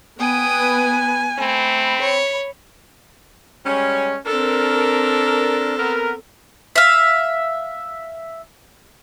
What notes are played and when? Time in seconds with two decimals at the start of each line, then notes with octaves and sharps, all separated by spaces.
0.20 B3 B4 G5 G#5 D#6
1.38 A3 C4 B5
2.01 C#5
3.66 G3 G#3 C#4
4.26 C4 D4 A4 A#4
5.78 B3 A#4
6.76 E5 F5